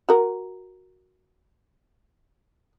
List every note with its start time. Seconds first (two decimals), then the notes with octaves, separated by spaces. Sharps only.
0.09 F#4 A#4